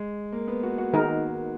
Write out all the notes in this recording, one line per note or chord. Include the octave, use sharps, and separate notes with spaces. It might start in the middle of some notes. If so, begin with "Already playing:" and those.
Already playing: G#3
A#3
B3
F#4
F#4
D#3 G#3 D#4 A#4